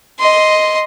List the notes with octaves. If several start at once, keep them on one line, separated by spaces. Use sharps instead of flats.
D#5 C6